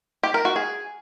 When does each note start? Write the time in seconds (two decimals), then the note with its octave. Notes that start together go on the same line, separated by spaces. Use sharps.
0.23 G4
0.34 A#4
0.45 F#4
0.56 G#4